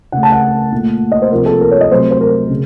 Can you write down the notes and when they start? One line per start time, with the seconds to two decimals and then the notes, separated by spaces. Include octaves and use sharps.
0.12 C#3 A3 F#5
0.23 A5
0.32 F#5
0.72 A#2 A3
1.12 D#5
1.22 C5
1.32 C3 F3 A#3 A#4
1.46 A4
1.61 A#4
1.71 C#5
1.81 D#5
1.91 C3 F#3 A3 C5
2.11 C5
2.21 A#4
2.50 C#3